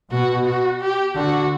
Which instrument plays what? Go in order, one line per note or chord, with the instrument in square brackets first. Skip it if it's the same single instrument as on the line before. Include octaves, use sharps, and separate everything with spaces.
[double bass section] B2 [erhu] F#4
[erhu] F#4
G4
[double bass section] D3 [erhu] F#4